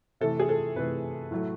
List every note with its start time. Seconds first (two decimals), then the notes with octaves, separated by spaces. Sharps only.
0.21 C3 E3 A3 A4
0.40 G#4
0.49 A4
0.76 C3 E3 A3 B4
1.31 A2 F#3 A3